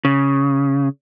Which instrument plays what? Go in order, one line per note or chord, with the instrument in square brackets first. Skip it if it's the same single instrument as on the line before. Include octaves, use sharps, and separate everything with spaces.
[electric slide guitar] C#3